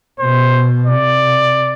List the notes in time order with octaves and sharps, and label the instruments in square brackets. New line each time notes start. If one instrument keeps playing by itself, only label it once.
[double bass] B2 [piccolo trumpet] C5
[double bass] C3 [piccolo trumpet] D5